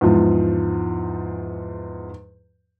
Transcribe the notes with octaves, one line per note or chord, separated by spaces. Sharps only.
E2 G#2 F3